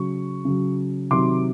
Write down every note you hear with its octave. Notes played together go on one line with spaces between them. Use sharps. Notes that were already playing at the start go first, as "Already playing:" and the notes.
Already playing: C#3 F#3 C#6
C#3 F#3
C3 D#3 F#3 C6 D6